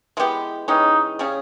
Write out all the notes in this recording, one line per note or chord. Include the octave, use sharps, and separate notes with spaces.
E3 G#3 B3 G4
E3 G#3 C#4 D#4 G4
C#3 G3 C#4 G#4